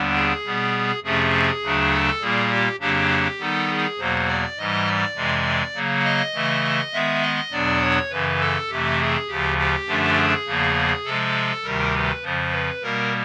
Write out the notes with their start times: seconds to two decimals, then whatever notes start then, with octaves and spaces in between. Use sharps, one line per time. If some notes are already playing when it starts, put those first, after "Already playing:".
Already playing: D#2 D3 G3 B3 D4
0.15 G#4
0.45 B2 G3 B3
1.03 F2 C3 F3 A3 C#4 G#4
1.62 D2 C#3 F#3 A3 D4
1.93 A4
2.21 A#2 G3 A#3 G#4
2.51 G4
2.80 F2 C#3 F#3 A#3 D4 G4
3.39 D#3 G3 B3 D#4 A4
3.69 G#4
3.98 E2 B2 F#3 A#3 C5
4.28 D5
4.57 G#2 E3 G3 D#5
4.86 D5
5.15 F2 C3 E3 G#3
5.74 C#3 F#3 A#3
6.05 D#5
6.34 C#3 E3 A3
6.93 D#3 G#3 B3 E5
7.22 D#5
7.51 E2 B2 F#3 B3 D4 D5
7.81 C#5
8.10 F#2 C#3 E3 B4
8.40 A4
8.69 F2 C3 E3 A3 G4
8.99 G#4
9.28 D2 C#3 F3 G4
9.58 G4
9.87 F#2 D3 F3 A3 D4
10.17 G#4
10.46 E2 C#3 F3 A#3
11.05 C3 F3 G#3 A4
11.63 D2 C3 D#3 G3 A#4
11.93 B4
12.23 F2 C#3 F3 C5
12.52 B4
12.82 B2 G3 A#3 A#4